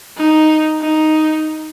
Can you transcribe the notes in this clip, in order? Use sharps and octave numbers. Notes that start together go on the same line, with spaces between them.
D#4
D#4